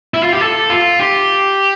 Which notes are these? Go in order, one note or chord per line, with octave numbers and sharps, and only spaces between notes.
E4
F4
G4
A4
F4
G4